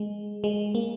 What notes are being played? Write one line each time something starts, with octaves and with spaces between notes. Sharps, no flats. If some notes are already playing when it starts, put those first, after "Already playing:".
Already playing: G#3
G#3
A#3